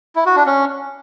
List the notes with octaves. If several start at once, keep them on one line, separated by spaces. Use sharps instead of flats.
E4
F#4
D4
C#4